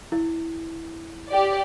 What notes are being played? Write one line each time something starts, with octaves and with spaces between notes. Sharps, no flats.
E4
G4 D5